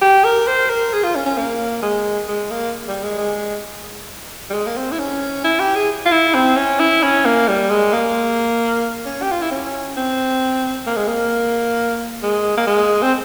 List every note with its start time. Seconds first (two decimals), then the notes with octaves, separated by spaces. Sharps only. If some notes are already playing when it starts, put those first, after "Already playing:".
0.02 G4
0.24 A#4
0.48 C5
0.70 A#4
0.93 G#4
1.04 F4
1.16 C#4
1.26 C#4
1.38 A#3
1.83 G#3
2.28 G#3
2.51 A#3
2.88 G3
3.04 G#3
3.18 G#3
4.50 G3
4.54 G#3
4.67 A#3
4.77 C4
4.92 E4
4.99 C#4
5.44 E4
5.60 G4
5.75 G#4
6.06 F4
6.12 E4
6.34 C4
6.57 C#4
6.80 E4
7.03 C#4
7.26 A#3
7.48 G3
7.70 G#3
7.93 A#3
9.06 C#4
9.22 G4
9.32 F4
9.42 E4
9.51 C#4
9.97 C4
10.87 A#3
10.97 G#3
11.08 A#3
12.23 G#3
12.57 A#3
12.67 G#3
13.02 C4